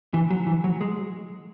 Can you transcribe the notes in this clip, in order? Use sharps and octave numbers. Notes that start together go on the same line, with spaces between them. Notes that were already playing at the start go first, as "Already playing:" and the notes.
E3
F#3
E3
F#3
G#3